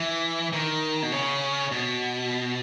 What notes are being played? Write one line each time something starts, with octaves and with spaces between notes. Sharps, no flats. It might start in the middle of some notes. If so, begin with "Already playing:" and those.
Already playing: E3
D#3
B2
C#3
B2